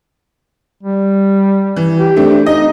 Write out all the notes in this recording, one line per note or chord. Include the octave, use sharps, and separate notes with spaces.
G3
E3
G4
A3 C4 D4
D#4 D#5